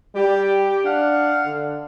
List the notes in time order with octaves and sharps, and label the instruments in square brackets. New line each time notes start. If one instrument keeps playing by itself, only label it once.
[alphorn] G3 [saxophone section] G4
[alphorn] D4 [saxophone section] F5 F#5
[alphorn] D3